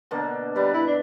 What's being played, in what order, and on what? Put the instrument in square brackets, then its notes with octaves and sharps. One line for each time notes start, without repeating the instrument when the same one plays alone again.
[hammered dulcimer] B2 D3 A#3
[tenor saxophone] G3 [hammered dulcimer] B4 D5
[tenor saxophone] E4
D4